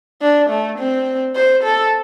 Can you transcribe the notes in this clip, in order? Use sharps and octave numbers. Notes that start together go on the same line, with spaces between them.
D4
A3
C4
C5
A4